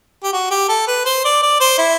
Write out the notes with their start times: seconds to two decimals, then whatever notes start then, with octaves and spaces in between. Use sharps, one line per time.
0.23 G4
0.33 F#4
0.51 G4
0.69 A4
0.87 B4
1.05 C5
1.25 D5
1.43 D5
1.60 C5
1.78 E4